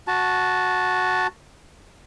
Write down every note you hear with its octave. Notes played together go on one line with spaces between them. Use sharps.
F#4 A5